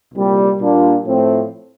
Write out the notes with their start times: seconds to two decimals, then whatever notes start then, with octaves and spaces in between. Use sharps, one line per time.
0.13 C2 A#2 G3
0.59 A#2 G3 A#3 D4 F4
1.05 A2 F3 A3 C4